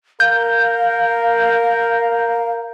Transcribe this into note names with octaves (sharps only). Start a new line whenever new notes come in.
A#4 F5 G6